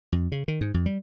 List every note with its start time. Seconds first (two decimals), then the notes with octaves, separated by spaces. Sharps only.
0.12 F2
0.32 C#3
0.48 D#3
0.61 G#2
0.74 F2
0.86 G3